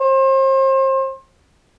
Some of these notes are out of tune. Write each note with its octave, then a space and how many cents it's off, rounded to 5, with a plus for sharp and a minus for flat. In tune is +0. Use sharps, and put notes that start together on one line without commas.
C5 +35